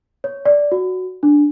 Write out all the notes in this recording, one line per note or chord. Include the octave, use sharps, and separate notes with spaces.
C#5
D5
F#4
D4